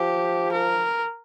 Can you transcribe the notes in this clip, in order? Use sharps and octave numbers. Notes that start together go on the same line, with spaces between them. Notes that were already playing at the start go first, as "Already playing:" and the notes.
Already playing: F3 G4
A#4